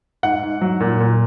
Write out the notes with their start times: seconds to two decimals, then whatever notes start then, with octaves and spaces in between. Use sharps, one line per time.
0.23 G#2 F#5
0.43 G#2
0.61 F#3
0.80 A#2
1.00 A#2